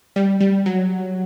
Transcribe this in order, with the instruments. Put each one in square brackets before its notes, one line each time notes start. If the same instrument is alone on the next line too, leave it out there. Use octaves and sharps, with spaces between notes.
[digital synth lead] G3
G3
F#3